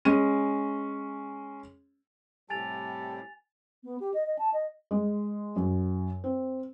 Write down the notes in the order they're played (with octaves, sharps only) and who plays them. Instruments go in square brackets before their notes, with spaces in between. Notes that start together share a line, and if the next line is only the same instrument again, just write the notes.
[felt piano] G#3 C#4 D#7
[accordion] A2 C3 G3 [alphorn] G4 [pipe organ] A4 [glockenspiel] G#5 A6 F7
[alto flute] B3
G4
D#5
D#5
A5
D#5
[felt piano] G#3
F#2
C4